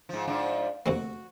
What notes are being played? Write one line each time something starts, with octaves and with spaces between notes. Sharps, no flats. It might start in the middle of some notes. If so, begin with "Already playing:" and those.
G#2 F3
G#2 F3 D4
D2 C3 A#3 F#4